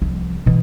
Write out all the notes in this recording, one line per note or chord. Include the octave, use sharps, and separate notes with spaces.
C2 F3
B2 E3